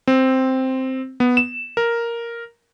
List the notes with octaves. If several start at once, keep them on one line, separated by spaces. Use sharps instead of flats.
C4
B3
E7
A#4